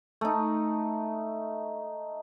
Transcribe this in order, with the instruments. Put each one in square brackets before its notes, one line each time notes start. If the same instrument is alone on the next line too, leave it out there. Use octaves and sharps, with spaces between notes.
[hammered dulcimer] A3 D#4